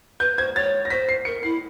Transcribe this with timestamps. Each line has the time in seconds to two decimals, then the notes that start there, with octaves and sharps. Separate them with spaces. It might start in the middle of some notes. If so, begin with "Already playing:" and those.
0.20 B4 G6
0.37 C5 G#6
0.56 C#5 A6
0.85 A#6
0.90 C5 B6
1.09 C7
1.25 A#4 C#7
1.43 E4 C7